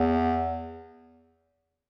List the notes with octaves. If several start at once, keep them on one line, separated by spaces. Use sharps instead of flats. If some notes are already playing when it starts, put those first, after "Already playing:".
Already playing: E2